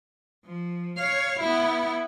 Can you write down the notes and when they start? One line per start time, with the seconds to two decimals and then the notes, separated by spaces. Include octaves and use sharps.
0.46 F3
0.97 C#5 F5
1.40 B3 E4